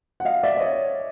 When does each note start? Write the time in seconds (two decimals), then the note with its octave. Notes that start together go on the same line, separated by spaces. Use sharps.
0.20 F#5
0.25 D#5 F5
0.43 D5 E5
0.57 D5
0.60 C#5 D#5